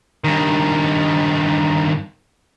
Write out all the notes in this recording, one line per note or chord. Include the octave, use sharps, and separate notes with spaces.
G2 D#3